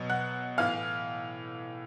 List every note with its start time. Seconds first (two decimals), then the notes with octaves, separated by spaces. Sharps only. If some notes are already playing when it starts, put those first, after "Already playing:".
Already playing: B2 F#3
0.09 F#5 F#6
0.58 A2 E3 F5 F6